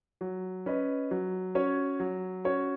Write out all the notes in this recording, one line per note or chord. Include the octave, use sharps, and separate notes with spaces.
F#3
C#4 B4 D#5
F#3
C#4 F#4 C#5
F#3
C#4 F#4 C#5